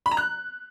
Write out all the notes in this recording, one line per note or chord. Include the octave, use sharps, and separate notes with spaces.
B5
A#5
F#6